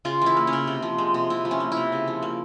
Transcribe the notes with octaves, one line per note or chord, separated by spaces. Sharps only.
C#3 F4
E3 E4
A#3
C#4
C#3
C3
F3
G#3
C3
C3 E4
F3
C#4
A#3
C3 E4
C#3
F3
A#3